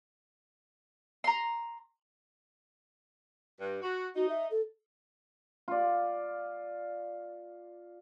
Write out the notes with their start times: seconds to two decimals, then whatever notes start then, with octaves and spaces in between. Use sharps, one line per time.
1.24 A#5 C6
3.60 G2
3.82 F#4
4.16 D#4 F#4
4.29 E5
4.51 A4
5.68 F4 D5